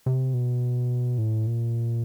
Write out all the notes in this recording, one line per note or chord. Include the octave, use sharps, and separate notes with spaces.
C3
B2
A2
A#2